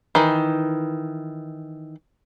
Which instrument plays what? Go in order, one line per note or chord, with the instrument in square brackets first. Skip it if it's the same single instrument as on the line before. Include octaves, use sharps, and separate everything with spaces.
[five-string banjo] D#3 E3